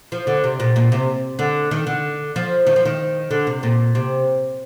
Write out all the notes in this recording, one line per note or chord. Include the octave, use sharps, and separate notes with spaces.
F3
D3
C3
A#2
A#2
C3
D3
D#3
D3
F3
D#3
F3
D#3
D3
C3
A#2
C3